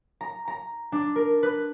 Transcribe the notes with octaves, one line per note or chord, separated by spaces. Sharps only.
A#5
A#5
D4
A#4
B4